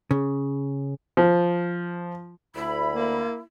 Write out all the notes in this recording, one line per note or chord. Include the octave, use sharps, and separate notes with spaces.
C#3
F3
D2 E4 B5
A#3